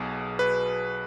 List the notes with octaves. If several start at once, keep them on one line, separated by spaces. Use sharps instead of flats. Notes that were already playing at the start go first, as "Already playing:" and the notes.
Already playing: B1 B2 G#4
B4